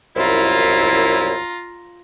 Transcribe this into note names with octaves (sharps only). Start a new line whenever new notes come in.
C2 F#2 E4 F4 A#5